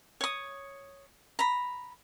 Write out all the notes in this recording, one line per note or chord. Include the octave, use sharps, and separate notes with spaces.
C#5 D#6
A#5 B5